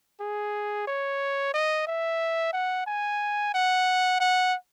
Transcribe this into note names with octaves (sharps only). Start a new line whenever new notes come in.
G#4
C#5
D#5
E5
F#5
G#5
F#5
F#5